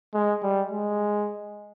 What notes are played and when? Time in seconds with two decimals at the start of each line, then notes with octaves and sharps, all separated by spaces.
0.15 G#3
0.43 G3
0.72 G#3